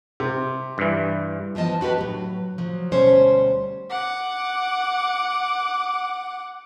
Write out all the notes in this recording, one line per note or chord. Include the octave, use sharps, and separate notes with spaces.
C3
G2 E3
E3 F3 B3 D#5 A5
D4 F#4 G4 B4
A2 F#3
F3 F#3
D2 B2 G3 C#4 C5 C#5
F#5 D6